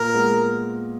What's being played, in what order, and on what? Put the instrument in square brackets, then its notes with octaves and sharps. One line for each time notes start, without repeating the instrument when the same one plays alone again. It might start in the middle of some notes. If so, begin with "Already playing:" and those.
Already playing: [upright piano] A#2 [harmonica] A#4
[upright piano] G#3 B3